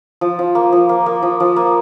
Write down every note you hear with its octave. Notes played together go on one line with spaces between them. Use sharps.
F3
F3
A#3
F3
A#3
A#3
F3
F3
A#3